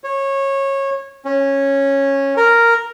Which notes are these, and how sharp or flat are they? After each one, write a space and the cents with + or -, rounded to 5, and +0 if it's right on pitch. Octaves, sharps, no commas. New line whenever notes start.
C#5 -20
C#4 -10
A#4 -5